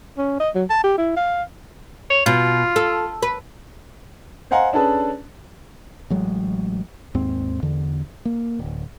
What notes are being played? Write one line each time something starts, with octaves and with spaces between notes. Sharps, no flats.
C#4
D#5
F#3
A5
G4
E4
F5
C#5
B2 F4
A4
B4
C5 D#5 F5 F#5 G#5 A#5
C#4 D4 G#4 A4 B4 A5
A1 F#3 G#3
D#2 G#2 C4
E2 D3
A#3
D1